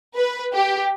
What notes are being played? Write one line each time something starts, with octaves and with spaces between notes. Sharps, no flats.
B4
G4